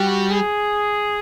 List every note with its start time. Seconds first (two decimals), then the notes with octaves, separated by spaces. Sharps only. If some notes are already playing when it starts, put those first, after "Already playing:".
Already playing: G3 F#4
0.30 G#4